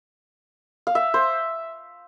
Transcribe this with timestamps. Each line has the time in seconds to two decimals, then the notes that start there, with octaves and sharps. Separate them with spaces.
0.87 F5
0.95 E5
1.14 C5